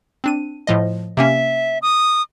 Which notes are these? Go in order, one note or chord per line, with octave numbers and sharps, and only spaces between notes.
C4 D4 D#7
A2 F3 D#5
C3 A#3 C#4 E5
D#6